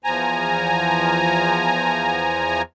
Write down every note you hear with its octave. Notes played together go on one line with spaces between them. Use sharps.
E2 F3 G#5 A#5